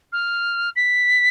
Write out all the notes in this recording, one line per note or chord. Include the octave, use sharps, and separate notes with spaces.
F6
B6